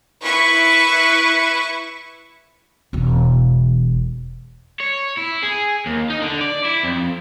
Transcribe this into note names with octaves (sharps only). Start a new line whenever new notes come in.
E4 B4 C#6
E1 E2
C#5
E4
G#4
D#2
D#4
D3
D5
E4
F2